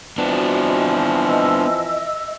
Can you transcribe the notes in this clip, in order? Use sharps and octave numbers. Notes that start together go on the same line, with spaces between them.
E3 F3 B3 C4 D4 F#4 D#5
D#5 E5 E6